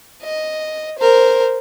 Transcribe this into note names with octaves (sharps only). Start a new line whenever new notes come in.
D#5
A#4 C5